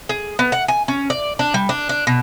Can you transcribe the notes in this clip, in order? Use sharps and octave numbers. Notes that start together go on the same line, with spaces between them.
G#4
B3
F#5
G#5
C#4
D5
D4
G3
D4
D4
B2